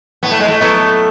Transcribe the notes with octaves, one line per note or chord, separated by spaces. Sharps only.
A2 B3
A3
G#3
A3
F#3 B3 E4 A4